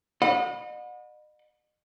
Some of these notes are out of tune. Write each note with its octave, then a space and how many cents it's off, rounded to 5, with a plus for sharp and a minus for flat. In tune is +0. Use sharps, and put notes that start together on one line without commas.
D#5 -35 F#5 -40 B5 -5